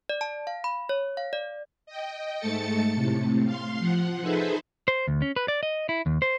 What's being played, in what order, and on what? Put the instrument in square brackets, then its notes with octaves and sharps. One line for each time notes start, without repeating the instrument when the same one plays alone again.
[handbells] D5
A5
F5
B5
C#5
F5
D5
[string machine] D#5 G5
G#2 A3 A4 A6 C#7
A2 C3
F5 C6
F3 F#5
D#4 G#4 A4 B4 C5 E5
[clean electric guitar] C5
D2
C#4
B4
D5
D#5
E4
D#2
C5